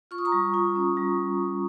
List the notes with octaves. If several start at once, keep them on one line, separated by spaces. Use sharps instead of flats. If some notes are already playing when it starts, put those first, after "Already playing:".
F4 C#6
D#6
A#5 C#6
G3
F4
C#4
G3